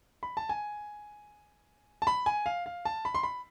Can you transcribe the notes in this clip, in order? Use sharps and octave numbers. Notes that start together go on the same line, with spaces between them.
B5
A5
G#5
A5
B5
G#5
F5
F5
A5
B5
C6
B5